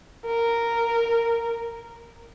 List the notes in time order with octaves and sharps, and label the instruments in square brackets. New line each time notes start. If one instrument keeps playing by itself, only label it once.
[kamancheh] A#4